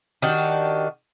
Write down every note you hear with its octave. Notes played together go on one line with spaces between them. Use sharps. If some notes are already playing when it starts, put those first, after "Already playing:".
D#3 D4 F#4 G4